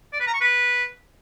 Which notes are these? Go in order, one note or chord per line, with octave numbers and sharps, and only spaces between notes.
D5
B4
A#5
C#6
B4